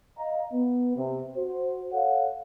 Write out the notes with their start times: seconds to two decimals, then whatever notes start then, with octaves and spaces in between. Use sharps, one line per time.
0.19 D#5 F5 A#5
0.53 B3
0.97 C3
1.37 F#4 C5
1.93 A4 C#5 F5 F#5